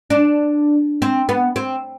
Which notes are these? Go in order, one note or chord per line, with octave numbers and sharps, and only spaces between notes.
D4
C4
B3
C4